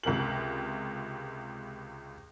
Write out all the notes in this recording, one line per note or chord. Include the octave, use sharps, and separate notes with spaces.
C#2 C3 A#4 F#7